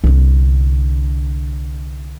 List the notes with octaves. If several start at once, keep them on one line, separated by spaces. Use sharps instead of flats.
C2 D3